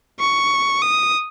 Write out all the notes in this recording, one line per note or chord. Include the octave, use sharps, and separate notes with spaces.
C#6
D#6